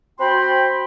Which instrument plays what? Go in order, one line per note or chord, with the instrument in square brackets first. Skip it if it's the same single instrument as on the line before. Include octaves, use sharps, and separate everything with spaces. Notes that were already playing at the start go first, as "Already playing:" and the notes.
[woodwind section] C4 F#4 G5 B5 C6